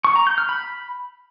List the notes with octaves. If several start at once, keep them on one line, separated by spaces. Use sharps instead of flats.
C#6
A#5
G6
F6
B5